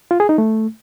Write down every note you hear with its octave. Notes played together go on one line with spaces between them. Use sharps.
F4
G#4
D#4
A3